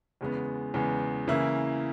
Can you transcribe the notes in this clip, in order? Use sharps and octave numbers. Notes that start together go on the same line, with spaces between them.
E2 C#3 G#3 B3
E2 C#3 G#3 B3
C#3 E3 A#3 E4